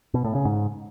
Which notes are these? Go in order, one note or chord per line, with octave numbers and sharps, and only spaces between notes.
B2
A2
C#3
G#2